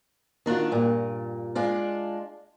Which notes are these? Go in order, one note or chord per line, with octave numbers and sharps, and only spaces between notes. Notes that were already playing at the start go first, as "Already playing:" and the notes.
D#3 D4 F4 F#4
G2 A#2
G#3 D4 F4